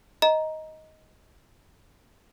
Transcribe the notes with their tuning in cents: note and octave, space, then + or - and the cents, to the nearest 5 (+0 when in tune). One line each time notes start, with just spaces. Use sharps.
D#5 +10 A#5 +5